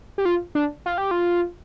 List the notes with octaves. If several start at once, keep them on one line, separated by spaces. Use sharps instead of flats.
G4
F4
D4
F4
G4
F4